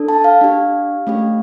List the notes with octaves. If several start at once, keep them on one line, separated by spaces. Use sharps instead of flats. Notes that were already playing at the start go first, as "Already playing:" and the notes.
Already playing: D4 A4
A5
F5
D4 G4
A3 C#4 G4